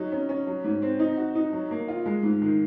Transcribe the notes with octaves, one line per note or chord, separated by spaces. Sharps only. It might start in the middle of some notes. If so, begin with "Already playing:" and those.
Already playing: F#3 D#4
C#4
C#4
F#3
G#2
C4
D#4
F#4
D#4
F#3
A#3
F4
G#3
G#2
D#3